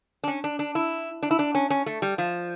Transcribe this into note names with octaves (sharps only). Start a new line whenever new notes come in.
D4
C#4
D4
D4
E4
D4
E4
D4
C#4
C#4
A3
G3
F3